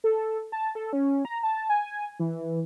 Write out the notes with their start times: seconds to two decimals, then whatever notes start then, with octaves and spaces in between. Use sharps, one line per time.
0.04 A4
0.52 A5
0.75 A4
0.93 C#4
1.25 A#5
1.43 A5
1.69 G#5
2.19 E3